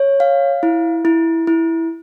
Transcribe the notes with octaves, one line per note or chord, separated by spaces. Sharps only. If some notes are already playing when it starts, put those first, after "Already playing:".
Already playing: C#5
F5
E4
E4
E4